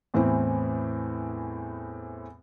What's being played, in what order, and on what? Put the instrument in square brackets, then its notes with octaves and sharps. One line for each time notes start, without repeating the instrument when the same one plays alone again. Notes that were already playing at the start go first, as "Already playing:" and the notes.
[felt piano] E2 A2 E3 C4